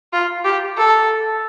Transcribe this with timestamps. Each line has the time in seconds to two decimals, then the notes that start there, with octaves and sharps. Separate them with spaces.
0.13 F4
0.44 G4
0.76 A4